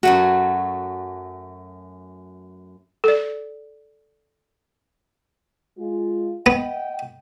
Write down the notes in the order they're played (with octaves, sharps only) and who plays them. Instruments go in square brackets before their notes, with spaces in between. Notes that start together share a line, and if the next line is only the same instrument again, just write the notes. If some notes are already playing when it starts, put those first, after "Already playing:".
[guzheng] F#2 F#3 A3 [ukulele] F#4
[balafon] A4 D5
[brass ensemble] G#3 F4
[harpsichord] B3 [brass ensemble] D#5 F#5 G5